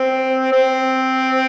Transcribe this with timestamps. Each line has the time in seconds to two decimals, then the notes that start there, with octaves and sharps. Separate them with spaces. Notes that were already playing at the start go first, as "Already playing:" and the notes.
Already playing: C4
0.52 C4